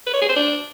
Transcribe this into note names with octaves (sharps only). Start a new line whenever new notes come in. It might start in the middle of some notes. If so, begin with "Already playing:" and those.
B4
C#5
G#4
C5
D4